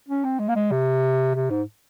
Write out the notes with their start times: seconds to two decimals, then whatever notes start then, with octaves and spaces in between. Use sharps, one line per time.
0.08 C#4
0.24 C4
0.39 G#3
0.49 A#3
0.56 G#3
0.71 C3
1.35 C3
1.50 G#2